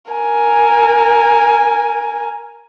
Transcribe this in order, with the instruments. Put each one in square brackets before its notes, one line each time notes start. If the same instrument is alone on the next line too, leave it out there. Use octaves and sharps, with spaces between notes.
[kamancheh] A#4 G#5